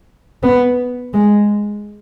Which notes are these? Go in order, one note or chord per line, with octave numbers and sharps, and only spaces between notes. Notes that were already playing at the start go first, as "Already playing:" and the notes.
B3
G#3